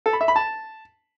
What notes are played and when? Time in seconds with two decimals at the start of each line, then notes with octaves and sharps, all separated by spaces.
0.06 A4
0.13 B5
0.21 E5
0.28 B5
0.36 A5